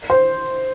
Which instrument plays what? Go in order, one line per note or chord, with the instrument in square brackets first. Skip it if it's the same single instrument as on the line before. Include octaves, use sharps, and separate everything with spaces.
[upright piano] C5